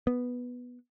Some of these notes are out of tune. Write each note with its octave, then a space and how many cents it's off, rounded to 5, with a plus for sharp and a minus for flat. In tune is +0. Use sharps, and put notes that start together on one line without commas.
B3 -5